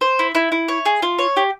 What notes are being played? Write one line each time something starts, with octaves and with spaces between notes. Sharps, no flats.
C5
E4
E4
E4
C#5
G#4
F4
C#5
G4